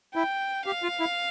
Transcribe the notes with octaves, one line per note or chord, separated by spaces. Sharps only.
E4 G5
G4 F5
F4
E4